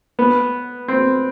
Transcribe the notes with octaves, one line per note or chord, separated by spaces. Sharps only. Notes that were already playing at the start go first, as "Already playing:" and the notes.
B3
C4